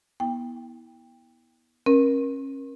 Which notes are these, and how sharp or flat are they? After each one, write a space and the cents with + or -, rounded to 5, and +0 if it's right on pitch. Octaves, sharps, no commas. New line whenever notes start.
B3 -30 E4 -30 G5 +20
C#4 -30 A#4 +25